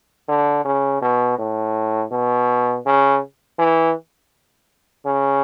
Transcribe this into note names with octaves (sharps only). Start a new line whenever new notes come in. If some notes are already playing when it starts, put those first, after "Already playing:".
D3
C#3
B2
A2
B2
C#3
E3
C#3